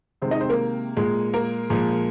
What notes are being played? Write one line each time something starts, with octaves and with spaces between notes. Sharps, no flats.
C3 D#3 G#3 C4 C5
D#4 D#5
C4 C5
A#3 A#4
A#2 G#3
A#3 A#4
A#2 F3 G#3